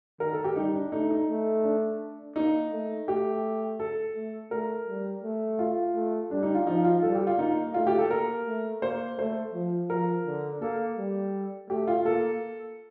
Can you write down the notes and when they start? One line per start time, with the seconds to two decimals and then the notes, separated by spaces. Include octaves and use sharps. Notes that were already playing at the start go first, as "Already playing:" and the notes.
0.20 D#3 A#4
0.33 A4
0.44 G4
0.56 G3 D#4
0.74 D4
0.92 A3 D#4
1.10 D#4
1.29 A3
1.64 D4
2.36 A#3 D#4
2.71 A3
3.08 A3 G4
3.80 A4
4.16 A3
4.51 A3 A#4
4.88 G3
5.23 A3
5.59 F4
5.95 A3
6.31 G3 D4
6.43 D#4
6.55 F4
6.67 F3 D#4
6.85 F4
7.02 G3 A4
7.15 G4
7.27 F4
7.38 A#3 D#4
7.74 A3 F4
7.87 G4
7.99 A4
8.10 A#3 A#4
8.46 A3
8.82 A#3 C5
9.19 A3 C5
9.54 F3
9.89 F3 A#4
10.26 D3
10.61 A#3 A4
10.97 G3
11.70 A3 G4
11.87 F4
12.06 A#3 A4